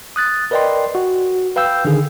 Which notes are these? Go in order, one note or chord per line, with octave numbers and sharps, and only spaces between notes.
D#6 F#6 A6
A#4 B4 D5 D#5 G5 C6
F#4
B4 F5 G5 E6 G6
D3 D#3 G#4